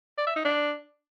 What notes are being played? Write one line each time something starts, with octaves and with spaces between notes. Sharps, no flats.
D5
E5
D#4
D4